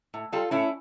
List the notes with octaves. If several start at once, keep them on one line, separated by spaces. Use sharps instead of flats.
A2
G3 F4 A4
A2 C#4 E4